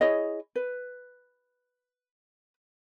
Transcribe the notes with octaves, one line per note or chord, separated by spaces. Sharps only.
E4 G#4 C#5 D#5
B4